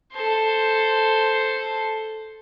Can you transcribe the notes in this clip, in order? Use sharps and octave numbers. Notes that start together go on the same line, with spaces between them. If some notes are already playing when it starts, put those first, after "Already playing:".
A4 C5